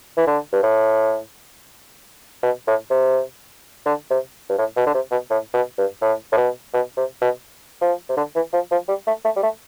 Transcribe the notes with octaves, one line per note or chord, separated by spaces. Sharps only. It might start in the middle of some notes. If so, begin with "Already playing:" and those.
E3
D3
G2
A2
B2
A2
C3
D3
C3
G2
A2
B2
D3
C3
B2
A2
B2
G2
A2
A2
B2
B2
C3
B2
F3
C3
D3
E3
F3
F3
G3
A3
A3
G3
A3